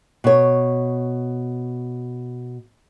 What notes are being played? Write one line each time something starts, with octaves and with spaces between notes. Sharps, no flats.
B2 C#5